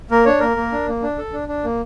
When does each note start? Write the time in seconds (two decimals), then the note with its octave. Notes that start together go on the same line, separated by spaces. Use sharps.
0.11 A#3 A#4
0.26 D4 C#5
0.40 A#3 A#4
0.57 A#3
0.72 D4
0.88 A#3
1.03 D4
1.18 A4
1.33 D4
1.48 D4
1.64 A#3